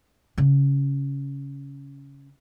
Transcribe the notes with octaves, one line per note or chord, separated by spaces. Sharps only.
C#3 C#4